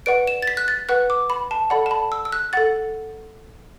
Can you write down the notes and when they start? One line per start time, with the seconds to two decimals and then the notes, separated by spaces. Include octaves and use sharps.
0.06 B4 D5 F#5 D7
0.27 E7
0.42 A6
0.47 B6
0.57 F#6
0.68 A6
0.89 B4 F#5 F#6
1.10 D6
1.30 B5
1.51 A5
1.70 A4 D5 F#5 B5
1.86 A5
1.91 B5
2.12 E6
2.25 E6
2.32 F#6
2.53 A4 F#5 A6